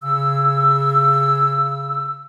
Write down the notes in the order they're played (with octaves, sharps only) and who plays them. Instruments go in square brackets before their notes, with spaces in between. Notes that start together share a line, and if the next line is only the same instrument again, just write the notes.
[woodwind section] C#3 E6